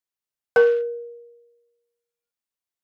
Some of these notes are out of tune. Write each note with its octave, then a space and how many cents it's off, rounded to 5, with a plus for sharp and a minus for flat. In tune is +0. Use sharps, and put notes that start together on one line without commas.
A#4 +25